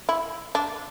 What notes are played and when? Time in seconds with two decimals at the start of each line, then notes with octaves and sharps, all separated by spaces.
0.09 E4
0.55 D4